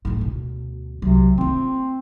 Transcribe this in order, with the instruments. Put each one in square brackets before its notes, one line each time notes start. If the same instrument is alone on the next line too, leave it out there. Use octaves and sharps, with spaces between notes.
[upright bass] A#1 A2
D2 B2
[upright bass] C2 F#3 [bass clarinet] C3
[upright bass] A#3 F4 [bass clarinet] C4